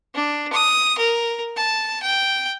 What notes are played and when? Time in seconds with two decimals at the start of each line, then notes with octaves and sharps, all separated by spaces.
0.15 D4
0.53 D#6
0.98 A#4
1.57 A5
2.03 G5